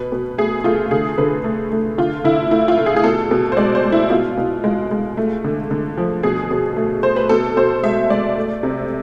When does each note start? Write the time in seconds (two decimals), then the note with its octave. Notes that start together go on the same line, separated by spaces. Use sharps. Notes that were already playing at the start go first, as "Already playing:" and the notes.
Already playing: B2 B4
0.12 B2
0.38 A3 G#4
0.64 A3 F4
0.91 D3 G#4
1.18 D3 B4
1.44 A3
1.72 A3
1.98 D3 F4
2.24 D3 E4
2.51 A3 E4
2.68 F4
2.78 A3
2.86 G#4
2.96 G#4
3.04 B2 A4
3.31 B2
3.52 C5
3.57 G#3 D5
3.75 C5
3.84 G#3
3.92 E4
4.10 B2 F4
4.37 B2
4.64 G#3
4.91 G#3
5.17 A3
5.44 D3
5.71 D3
5.98 F3
6.23 B2 G#4
6.51 B2
6.76 A3
7.03 A3 C5
7.16 B4
7.29 B2 A4
7.57 B2 C5
7.83 G#3 E5
8.09 G#3 D5
8.36 A3
8.63 C3